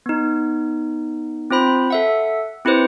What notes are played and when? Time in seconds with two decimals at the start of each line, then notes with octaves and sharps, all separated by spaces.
0.06 B3 D#4
1.51 C4 F4 C5 B5
1.90 A4 E5 F#5
2.65 C4 E4 G4 B4 C5